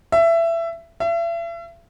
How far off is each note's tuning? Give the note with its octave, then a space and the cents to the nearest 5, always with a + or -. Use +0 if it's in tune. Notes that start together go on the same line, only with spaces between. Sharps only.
E5 +20
E5 +40